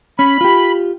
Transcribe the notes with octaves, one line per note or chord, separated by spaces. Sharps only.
C#4 B5
F4 G4